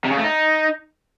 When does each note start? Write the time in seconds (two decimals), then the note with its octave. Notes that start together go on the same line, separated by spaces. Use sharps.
0.05 C3
0.12 C#3
0.18 A3
0.24 D#4